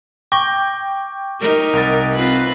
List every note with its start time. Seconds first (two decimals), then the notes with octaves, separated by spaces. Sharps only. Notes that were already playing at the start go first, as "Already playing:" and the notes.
0.32 G5 C#6 D6 G6 A#6
1.41 D#4 G4 A#4
1.73 C2 A6
2.14 C4 F4 B4